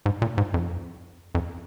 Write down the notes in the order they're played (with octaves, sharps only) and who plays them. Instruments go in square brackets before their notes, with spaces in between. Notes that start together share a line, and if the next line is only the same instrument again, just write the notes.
[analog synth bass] G#2
A#2
G#2
F2
F2